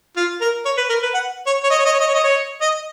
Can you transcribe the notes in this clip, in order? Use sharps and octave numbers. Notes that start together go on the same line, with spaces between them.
F4
A#4
C#5
B4
A#4
B4
F#5
C#5
C#5
D#5
C#5
D#5
C#5
D#5
C#5
D#5
C#5
D#5